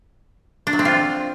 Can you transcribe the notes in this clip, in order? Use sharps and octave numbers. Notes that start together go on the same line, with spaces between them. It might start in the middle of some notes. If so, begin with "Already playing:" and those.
D4
F#3
C4
F4